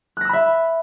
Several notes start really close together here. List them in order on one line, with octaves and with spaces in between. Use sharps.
F#6 A#6 E6 B5 E5